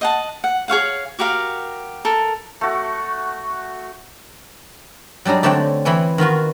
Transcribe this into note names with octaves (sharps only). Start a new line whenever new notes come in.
D#5 F#5 A5
F#5
G#4 C#5 F5 F#5
F#4 G4 A#4 F5
A4 A#4
A3 F#4
F#3 G3 D4 D#4 G#4
D3 A3 C4 C#5 F#5 G5
E3 C4 E4 C#5 G#5
D#3 B3 F4 F#4